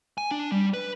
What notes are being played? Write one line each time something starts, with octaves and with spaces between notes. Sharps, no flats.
G#5
D4
G3
B4